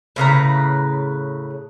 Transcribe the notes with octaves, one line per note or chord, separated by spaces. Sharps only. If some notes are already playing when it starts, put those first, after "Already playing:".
A2 C#3 B4 A#5